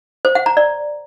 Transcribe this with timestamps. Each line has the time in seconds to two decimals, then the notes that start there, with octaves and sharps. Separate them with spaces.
0.25 C5
0.35 F#5
0.46 A#5
0.57 D5